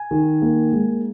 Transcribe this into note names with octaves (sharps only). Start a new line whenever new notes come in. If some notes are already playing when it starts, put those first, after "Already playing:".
Already playing: G#5
D#3
A#3
G#3